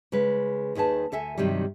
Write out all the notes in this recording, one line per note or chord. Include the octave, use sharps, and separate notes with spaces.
C#3 G#3 B4
D#2 D#3 G#4 B4 A5
D2 A4 E5 G#5
G2 C3 D#3 F#3 G3